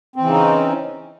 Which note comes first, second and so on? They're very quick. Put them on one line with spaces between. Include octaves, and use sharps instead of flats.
C4 E3 C#3 D#4 C#4